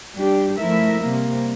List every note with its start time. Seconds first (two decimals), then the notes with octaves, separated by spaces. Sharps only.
0.15 G3 D4 G4
0.58 F3 A3 E4 A#4 E5
1.01 C3 G3 A#3